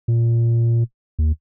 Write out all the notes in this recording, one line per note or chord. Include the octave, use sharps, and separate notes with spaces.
A#2
D#2